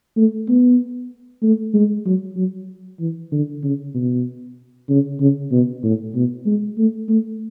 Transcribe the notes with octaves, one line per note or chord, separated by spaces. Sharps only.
A3
B3
A3
G#3
F#3
F#3
E3
D3
C#3
B2
C#3
C#3
B2
A2
B2
G#3
A3
A3